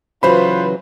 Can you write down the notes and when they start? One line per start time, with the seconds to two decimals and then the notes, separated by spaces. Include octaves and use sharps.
0.23 C#3 E3 F#3 F4 B4 C5 B5